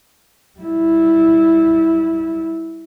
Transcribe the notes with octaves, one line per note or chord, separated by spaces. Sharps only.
G3 E4